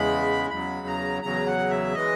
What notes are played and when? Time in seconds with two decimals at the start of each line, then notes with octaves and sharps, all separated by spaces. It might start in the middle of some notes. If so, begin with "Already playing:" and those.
Already playing: E2 C#3 G#3 B5
0.50 E2 C#3 F#3 B5
0.87 A#5
1.22 E2 C#3 F#3 A#5
1.46 F#5
1.70 E5
1.94 E3 G#3 D#5